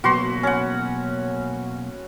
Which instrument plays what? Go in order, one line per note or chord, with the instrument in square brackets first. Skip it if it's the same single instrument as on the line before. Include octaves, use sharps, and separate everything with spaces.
[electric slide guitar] B2 F#3 A#3 [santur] F#4 B4 C6
[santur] C#4 F#5